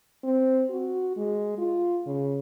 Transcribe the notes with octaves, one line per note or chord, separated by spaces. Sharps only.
C4
F#4
G#3
F4
C#3